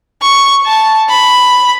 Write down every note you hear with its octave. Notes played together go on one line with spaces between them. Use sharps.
C#6
A5
B5